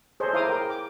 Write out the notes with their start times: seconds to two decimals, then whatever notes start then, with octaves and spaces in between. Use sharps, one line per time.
0.20 G#4 A4 C5 C#5 D#5
0.33 E4 C5 F5 A#5 D6 D#6
0.46 G#4 A#4 G5
0.70 D6